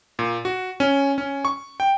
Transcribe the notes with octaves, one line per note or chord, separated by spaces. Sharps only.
A#2
F#4
C#4
C#4
C#6
G5